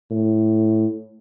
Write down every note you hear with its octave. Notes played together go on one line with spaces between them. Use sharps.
A2